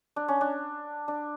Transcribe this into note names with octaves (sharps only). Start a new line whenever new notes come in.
D4
C#4
D4
D4